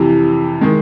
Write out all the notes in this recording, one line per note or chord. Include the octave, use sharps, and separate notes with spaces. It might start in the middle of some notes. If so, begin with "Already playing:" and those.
Already playing: F2 C3 E3
D#3 G#3